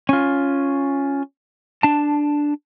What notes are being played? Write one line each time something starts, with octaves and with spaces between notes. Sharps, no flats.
C#4 F4
D4 A5